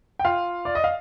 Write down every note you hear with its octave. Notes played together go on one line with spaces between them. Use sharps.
G5
F4 F5
D5
D#5
F5